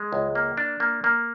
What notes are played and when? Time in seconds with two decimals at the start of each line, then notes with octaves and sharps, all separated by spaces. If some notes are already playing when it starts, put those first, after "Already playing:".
Already playing: G#3
0.13 C#2
0.35 A#3
0.57 D4
0.80 A#3
1.04 A#3